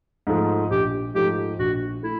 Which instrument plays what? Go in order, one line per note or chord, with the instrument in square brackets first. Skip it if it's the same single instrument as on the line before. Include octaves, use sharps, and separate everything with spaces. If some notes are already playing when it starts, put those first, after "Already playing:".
[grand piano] G#2 F3 A3
[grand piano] A#1 [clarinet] G4
[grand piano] G#2 F3 A3 [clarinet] G4
[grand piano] A#1 [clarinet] F#4
[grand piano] A3 [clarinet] E4